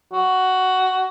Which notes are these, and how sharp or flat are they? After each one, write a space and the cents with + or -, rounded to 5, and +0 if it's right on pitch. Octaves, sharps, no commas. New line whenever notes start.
F#4 +10